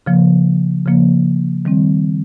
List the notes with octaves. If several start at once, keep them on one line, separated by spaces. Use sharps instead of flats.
C#3 F3 A#3
C#3 F3 A#3
D#3 G3 C4